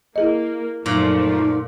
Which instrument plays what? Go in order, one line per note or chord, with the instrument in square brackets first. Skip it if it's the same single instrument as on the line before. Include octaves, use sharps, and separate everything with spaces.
[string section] A#3 [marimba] E4 G#4 D#5
[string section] F#2 F3 A3 [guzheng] A#2 [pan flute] D#4